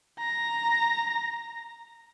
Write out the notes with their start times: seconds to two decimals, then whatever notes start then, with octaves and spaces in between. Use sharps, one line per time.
0.19 A#5